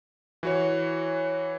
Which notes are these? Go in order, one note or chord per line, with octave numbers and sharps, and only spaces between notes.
E3 F#4 C#5